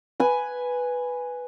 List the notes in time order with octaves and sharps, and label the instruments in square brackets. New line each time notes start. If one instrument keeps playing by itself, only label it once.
[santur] B4 G#5